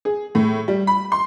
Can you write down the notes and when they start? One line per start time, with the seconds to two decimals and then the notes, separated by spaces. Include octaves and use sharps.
0.05 G#4
0.35 A2
0.68 G3
0.87 B5
1.12 C6